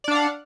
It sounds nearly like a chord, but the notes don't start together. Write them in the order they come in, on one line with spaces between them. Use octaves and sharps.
D5 D4 F5 F#5